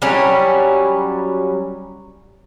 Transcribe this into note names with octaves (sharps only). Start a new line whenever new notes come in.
F#3 G3 C#4 E4